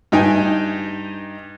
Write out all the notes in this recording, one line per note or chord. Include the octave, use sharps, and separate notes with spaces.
G2 D#4 G5 G#5